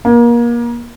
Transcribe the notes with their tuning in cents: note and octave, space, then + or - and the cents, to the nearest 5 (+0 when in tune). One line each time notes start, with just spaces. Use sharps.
A#3 +30